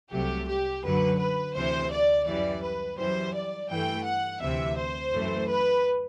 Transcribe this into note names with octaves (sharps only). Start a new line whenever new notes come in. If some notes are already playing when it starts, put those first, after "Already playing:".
C2 C3 F#3 A3 G4
G4
F#2 D3 F#3 B4
B4
D2 C3 E3 C5
D5
F#2 E3 G3 D5
B4
F#2 E3 G3 C5
D5
G2 E3 A3 G5
F#5
D2 C3 E3 E5
C5
F#2 E3 A3
B4